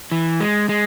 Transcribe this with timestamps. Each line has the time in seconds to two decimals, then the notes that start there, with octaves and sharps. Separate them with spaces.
0.12 E3
0.40 G#3
0.69 G#3